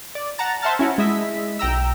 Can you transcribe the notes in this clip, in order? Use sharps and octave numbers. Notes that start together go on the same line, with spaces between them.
D5
F#5 A5 A#5 A6
C5 E5 F#5 A5 F6 A6
C#4 E4 F#4
G#3 E4 D#5 E5 B6
B1 G5 A#5 E6